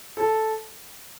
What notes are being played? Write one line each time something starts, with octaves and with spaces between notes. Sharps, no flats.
A4